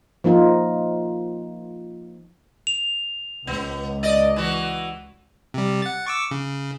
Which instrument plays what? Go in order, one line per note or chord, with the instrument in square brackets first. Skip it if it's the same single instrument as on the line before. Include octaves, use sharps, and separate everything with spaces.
[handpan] F3 A#3 D#4 F4
[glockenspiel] F7
[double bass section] C#2 [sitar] B3
[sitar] D5 D#5
E3 F#4
[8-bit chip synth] C3 G3
F#5 A6
C#6 D6 E6
C#3